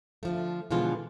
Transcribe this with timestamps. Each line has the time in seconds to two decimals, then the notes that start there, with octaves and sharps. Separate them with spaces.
0.23 D3 F3 A3
0.71 B2 D3 E3 F3 G#3 F4